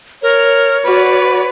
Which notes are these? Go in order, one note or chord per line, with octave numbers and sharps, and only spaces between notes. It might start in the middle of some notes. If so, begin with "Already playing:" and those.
A#4 C#5
F#4 B4 D5